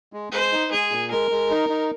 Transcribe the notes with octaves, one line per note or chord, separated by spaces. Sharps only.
G#3
G#3 C5
D#4
G#3 G#4
A#2
G#3 A#4
G#3
D#4
D#4